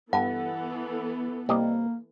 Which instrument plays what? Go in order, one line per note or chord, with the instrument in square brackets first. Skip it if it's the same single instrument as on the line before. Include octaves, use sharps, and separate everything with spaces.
[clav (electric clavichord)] G2 [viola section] E3 B3 A4 [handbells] F#5
[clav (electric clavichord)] C2 G4 D#5 [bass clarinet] A#3